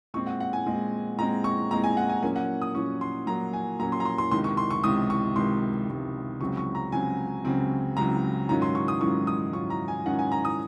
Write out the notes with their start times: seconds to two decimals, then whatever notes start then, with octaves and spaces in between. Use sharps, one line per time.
0.14 A#2 G#3 C4 C#6
0.27 F#5
0.40 F#5
0.53 G#5
0.66 A#2 G#3 C4
1.18 A#2 G#3 C4 A#5
1.44 C#6
1.71 A#2 G#3 C4 A#5
1.84 G#5
1.97 F#5
2.10 G#5
2.22 A#2 F#3 A#3 C#4 G#5
2.36 F#5
2.62 D#6
2.74 A#2 F#3 A#3 C#4 C#6
3.01 C6
3.27 A#2 F#3 A#3 C#4 A#5
3.53 G#5
3.79 A#2 F#3 A#3 C#4 A#5
3.92 C6
4.00 A#5
4.05 C6
4.18 C6
4.31 C#2 C3 D#3 C6
4.44 C#6
4.57 C6
4.70 C#6
4.83 C#2 C3 D#3 D#6
5.10 C#6
5.36 C#2 C3 D#3 C6
5.88 C#2 C3 D#3
6.40 C#2 C#3 F#3 C4 C#6
6.57 C#6
6.75 A#5
6.92 C#2 C#3 F#3 C4 G#5
7.45 C#2 C#3 F#3 C4
7.97 C#2 C#3 F#3 C4 A#5
8.49 G#2 D#3 F#3 C#4 F4 A#5
8.62 C6
8.75 C#6
8.88 D#6
9.01 G#2 D#3 F#3 C#4 F4 C#6
9.27 D#6
9.53 G#2 D#3 F#3 C#4 F4 C#6
9.70 A#5
9.88 G#5
10.05 G#2 D#3 F#3 C#4 F4 F#5
10.19 G#5
10.32 A#5
10.45 D#6